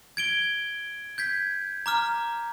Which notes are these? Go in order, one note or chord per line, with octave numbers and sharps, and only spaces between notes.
G#6 D7 G7
G6 G#6 B6
A#5 D6 F6